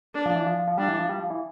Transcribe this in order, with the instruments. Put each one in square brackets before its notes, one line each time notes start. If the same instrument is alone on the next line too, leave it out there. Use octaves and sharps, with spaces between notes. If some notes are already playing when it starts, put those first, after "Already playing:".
[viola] D4
[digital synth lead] F3
E3
F3
F3
[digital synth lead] G3 [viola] D4
[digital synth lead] E3
F3
G3
F3
E3